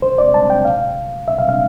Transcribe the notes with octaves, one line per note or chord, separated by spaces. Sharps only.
C5
D5
A5
G5
F5
E5
F5
F5